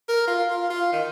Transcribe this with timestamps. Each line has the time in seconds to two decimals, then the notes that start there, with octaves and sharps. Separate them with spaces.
0.09 A#4
0.28 F4
0.51 F4
0.70 F4
0.92 D#3